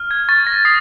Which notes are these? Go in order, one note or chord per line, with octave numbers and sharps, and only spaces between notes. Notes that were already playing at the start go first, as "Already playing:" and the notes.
Already playing: F6
G#6
C#6 A6
A#6
D#6 C7